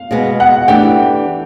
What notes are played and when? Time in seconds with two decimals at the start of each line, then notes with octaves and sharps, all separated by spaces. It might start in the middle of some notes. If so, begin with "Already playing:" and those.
Already playing: F5
0.11 B2 G#3 B3
0.40 F#5
0.68 E3 A3 D4 G4 G5